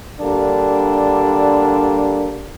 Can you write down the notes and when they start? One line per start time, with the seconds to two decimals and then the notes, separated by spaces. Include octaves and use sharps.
0.20 D3 G3 A#3 D4